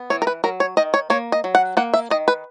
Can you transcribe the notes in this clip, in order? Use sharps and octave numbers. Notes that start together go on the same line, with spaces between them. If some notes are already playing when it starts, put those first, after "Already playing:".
Already playing: B3
E3 C#5
A#4
B4
F#3 A#4
C#5
D#3 D#5
C#5
A#3 C#5
D#5
F#3
F#5
A#3 F#5
E5
D#3 D#5
B4